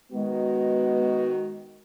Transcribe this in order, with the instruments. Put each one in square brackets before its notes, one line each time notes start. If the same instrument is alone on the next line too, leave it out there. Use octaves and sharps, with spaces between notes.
[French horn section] D#3 F#4 [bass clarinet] G#3 [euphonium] B3